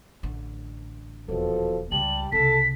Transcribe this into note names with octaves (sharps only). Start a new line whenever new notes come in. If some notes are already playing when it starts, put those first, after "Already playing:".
A1 D3
D#1 E2 B2 F3 A4
C#2 C#3 G3 G5 A5 F#7
C2 C#3 A4 A5 B6